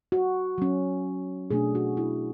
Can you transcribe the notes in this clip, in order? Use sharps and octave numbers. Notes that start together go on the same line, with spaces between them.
F#4
F#3 C#4
B2 A3 D4 G#4
F#4
E4